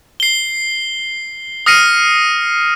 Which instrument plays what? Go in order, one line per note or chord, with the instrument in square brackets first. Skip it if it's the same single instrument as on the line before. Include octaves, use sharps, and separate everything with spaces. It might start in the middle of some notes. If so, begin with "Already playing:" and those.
[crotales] C7 G7
D#6 F6 A#6 C7 C#7 D#7